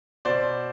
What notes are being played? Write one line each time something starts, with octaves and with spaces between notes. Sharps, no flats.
B2 C5 D5